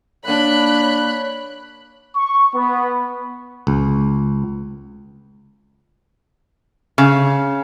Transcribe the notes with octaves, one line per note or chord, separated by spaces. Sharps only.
A#3 D4 C#5 B5 F#6
C#6
B3
C#2
C#3